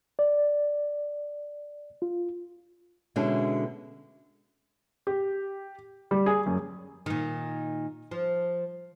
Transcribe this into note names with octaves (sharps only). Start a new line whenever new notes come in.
D5
F4
B2 D3 G#3 B3 C#4 E4
G4
G3
G#4
F#2
A#2 D#3
F3